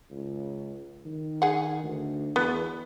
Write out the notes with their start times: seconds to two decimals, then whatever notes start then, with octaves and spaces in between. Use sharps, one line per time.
0.11 C#2
1.05 D#3
1.42 G#4 F#5
1.84 D2
2.36 E2 B3